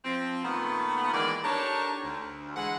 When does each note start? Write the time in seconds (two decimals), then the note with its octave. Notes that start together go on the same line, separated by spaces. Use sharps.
0.05 F3 C4
0.44 A#2 D#3 A3 B3
1.13 D#3 E3 G#3 A#3 D5
1.44 D4 D#4 G4 A4 A#4 C#5
2.04 D2
2.56 E3 G#3 D4 F#5